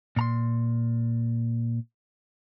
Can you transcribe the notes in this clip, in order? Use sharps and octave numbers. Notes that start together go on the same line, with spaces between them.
A#2 A#5 C6